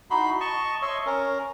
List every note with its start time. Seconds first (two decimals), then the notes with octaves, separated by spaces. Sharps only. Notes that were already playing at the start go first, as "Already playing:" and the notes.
0.10 D#4 E4 F#4 B5 C6
0.40 D#5 A5 C#6
0.82 C#5 D#5 E5 C6 C#6
1.06 C#4 A#4